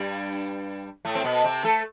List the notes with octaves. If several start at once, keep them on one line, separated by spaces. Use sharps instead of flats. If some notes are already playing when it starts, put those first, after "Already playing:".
Already playing: G2 G3
A2 A3
C4
B2 B3
C3 C4
A3 A4